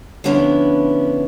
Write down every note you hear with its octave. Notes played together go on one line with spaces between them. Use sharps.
D3 F3 B3 C#4 D4 E4